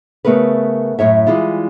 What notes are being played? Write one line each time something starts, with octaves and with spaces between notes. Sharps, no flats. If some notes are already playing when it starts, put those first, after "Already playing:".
C#3 A3 B3 A#4 B4
F#2 A2 C#5 E5
E3 G3 G#3 E4 F4